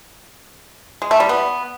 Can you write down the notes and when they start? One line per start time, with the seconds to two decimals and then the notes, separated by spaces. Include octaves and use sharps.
1.02 G#3
1.11 A3
1.20 G3
1.29 B3